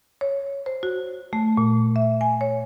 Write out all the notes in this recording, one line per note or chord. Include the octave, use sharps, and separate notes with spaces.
C#5
C5
F#4
A3
A#2
E5
G#5
C#5